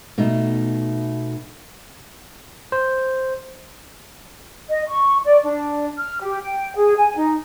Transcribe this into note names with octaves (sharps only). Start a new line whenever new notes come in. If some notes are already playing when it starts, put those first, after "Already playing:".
B2 A3 D#4
C5
D#5
C#6
D5
D4
F6
G4
G5
G#4
G#5
D#4